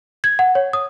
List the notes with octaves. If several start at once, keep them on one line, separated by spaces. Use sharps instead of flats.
G#6
F#5
C#5
D#6